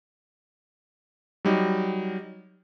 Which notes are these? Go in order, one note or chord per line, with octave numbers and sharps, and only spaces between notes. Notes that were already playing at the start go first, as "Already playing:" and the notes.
F#3 G3 D#4